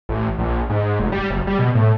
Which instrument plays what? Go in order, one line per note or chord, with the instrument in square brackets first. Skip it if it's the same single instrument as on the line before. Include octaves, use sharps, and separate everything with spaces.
[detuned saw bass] A1
A#1
G#2
F1
G3
F#1
G3
B2
A2